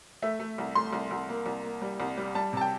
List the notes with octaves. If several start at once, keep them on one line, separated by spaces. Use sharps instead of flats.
A3 E5
A3
C2
A3 C6
C2
C2
A#3
C2
A#3
G3
C2
G3
G3 A5
C3 A5
G5